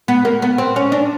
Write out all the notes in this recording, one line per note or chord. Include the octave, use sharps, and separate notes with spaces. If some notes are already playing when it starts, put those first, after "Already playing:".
B3
A#3
B3
C4
C#4
D4